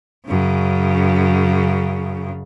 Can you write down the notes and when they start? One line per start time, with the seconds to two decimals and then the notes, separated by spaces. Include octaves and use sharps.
0.28 F#2 C#3